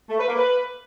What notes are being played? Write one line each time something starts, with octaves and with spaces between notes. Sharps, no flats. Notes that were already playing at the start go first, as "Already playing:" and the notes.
A3
B4
A#3
B4